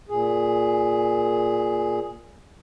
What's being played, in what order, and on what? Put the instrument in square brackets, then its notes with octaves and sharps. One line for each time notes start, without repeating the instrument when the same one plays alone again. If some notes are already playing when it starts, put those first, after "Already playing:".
[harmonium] A#2 G#4